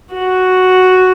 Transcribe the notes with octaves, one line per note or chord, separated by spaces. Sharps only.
F#4